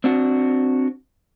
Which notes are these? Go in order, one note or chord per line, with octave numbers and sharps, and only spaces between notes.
C4 D4 F#4